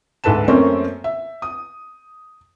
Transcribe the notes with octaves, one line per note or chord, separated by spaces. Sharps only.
D2 G#2 A4 B4 A5 E7
F#2 A3 A#3 C4 C#4
E5
D#6